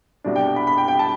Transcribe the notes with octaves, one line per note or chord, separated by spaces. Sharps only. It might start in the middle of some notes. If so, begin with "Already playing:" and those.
C2 B2 G3 D4
G5
G5
B5
B5
G5
G5
A5